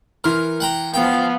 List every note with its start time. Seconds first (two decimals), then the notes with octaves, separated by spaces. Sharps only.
0.24 E3 A#4 C6 F6
0.60 F#5 G5 A#5
0.94 F3 B3 F5 G5